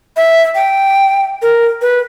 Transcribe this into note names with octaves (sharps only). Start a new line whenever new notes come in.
E5
G5
A#4
B4